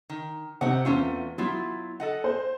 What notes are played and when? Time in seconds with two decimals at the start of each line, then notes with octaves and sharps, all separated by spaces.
0.10 D#3
0.61 C3 D#4 C#5 F#5
0.85 E2 A3 C4 C#4 F4
1.38 F#3 B3 E4 F4
2.00 A4 D#5 F#5
2.24 C5